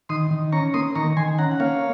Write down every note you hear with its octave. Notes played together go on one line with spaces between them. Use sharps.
D#3 C6 D#6
D#3
C#4 A#5 C#6
A#3 C6 D#6
D#3 A#5 C#6
D#3 G#5 C6
C#4 F#5 A#5
F#5
A#3 C#5 F5